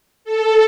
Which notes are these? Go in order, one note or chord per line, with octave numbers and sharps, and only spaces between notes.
A4